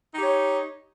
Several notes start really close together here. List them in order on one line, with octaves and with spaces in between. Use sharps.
D#4 G4 C#5